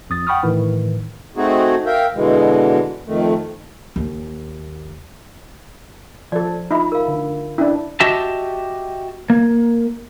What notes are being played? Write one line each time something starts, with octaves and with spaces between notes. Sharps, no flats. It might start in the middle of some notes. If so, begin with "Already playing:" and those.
F2 D#6 A6
F#5 G5 B5 C#6 D#6 F6
A2 D#3 E3
A3 C4 D#4 F#4 G#4
A#4 E5 F5 G5
B2 D3 E3 G#3
F2 D#3 A3
D#2
F3 A4 D5
D#4 F4 E5 B5
A#4 F5
D3
C#4 D4 E4
F#4 G4 D#5 E5 A5
A#3